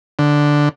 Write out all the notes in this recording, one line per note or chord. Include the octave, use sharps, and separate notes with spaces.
D3